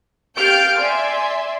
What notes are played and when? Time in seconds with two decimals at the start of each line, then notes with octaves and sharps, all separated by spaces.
0.37 G4 F5 F6 G6 A6 D7
0.79 D5 E5 G#5 C6